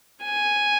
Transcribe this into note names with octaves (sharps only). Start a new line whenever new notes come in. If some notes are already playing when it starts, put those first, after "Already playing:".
G#5